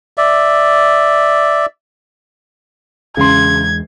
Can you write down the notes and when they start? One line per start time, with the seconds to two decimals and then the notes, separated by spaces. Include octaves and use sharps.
0.18 D5 E5
3.17 E2 C#3 G#3 C6 G#6